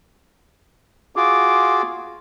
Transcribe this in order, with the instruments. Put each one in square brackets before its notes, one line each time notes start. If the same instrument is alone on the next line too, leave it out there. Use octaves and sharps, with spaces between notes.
[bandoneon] F4 F#4 G#4 [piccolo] D6